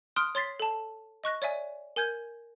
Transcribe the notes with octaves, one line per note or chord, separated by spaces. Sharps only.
C6 D#6 F6 F#6 D7
C#5 C6 A6 B6 C7
A4 A5
D#5 C#6 F#6 A#6
C#5 D5 E5 G#5
A#4 G#5 G6 G#6